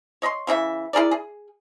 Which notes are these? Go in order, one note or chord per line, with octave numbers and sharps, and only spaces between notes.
C#5 D#5 B5 C6
C#3 E3 D#4 E5
E4 G#4 A#4 D5
G#4